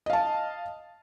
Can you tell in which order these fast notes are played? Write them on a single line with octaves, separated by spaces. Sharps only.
D#5 F5 A5